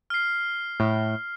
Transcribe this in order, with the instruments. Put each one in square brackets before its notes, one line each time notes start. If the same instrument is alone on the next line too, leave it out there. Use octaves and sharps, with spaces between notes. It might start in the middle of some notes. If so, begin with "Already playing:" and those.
[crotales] F6 C7
[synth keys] A2